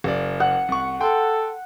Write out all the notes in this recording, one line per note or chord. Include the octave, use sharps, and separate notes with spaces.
F#1 D5
F#5
C2 C#6
A4 G5 C6